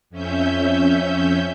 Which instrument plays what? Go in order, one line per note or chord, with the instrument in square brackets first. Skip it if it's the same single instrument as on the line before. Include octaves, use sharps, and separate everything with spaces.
[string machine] F2 C#4 E5 G6